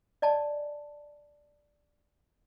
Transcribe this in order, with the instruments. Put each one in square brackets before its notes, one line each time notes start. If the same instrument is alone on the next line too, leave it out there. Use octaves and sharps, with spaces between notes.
[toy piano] D5 D#5 G#5 A5